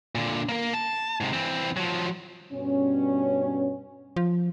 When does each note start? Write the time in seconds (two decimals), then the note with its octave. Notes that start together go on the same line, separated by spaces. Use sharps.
0.15 A#2 D3
0.49 A#3 A#4
0.74 A5
1.21 G#2 C3
1.33 E3 C4
1.77 F3 F#3
2.53 G2 B2 C#4
4.16 F3